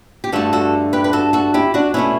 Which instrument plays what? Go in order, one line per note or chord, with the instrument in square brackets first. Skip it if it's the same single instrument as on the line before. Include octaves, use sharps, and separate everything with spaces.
[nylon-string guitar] G4
G2 D3 A3 F#4 A4
F#4 A4
G4 B4
B4
F#4 A4
F#4 A4
E4 G4
D4 F#4
B2 A3 C#4 E4